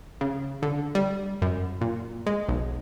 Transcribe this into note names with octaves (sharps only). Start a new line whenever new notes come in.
C#3
D3
G3
F#2
A#2
G#3
B1